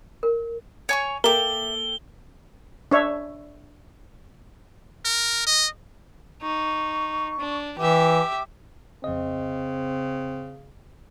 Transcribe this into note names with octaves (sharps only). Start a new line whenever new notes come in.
A#4
C#5 G#5 C#6
A#3 A4 E5 G5 D6 G7
D4 C#5 E5
A#4
D#5
D#4 C#6
D4
E3 G4 E5 D6
F2 C#3 C4 D#5